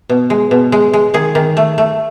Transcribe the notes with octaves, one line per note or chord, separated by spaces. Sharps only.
B2
G#3
B2
G#3
G#3
D#3 G#4
D#3
A3
A3